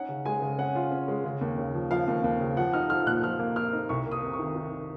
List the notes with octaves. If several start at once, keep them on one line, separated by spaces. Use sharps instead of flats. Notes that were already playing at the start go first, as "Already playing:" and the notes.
Already playing: C#4 D#4 F#5
C#3
G#3 G#5
C#3
C#4 F#5
F4
C#4
G#3
C#3
D#2
C#3
F3
F3 F5
D#2
D#2
C#3
F3 F#5
D#4 F6
F3 F6
A#2 F#6
F3 F6
A#3
A#3 F6
D#4
C2 C#6
A#3
D#6
C3
C#6
D#3
D#3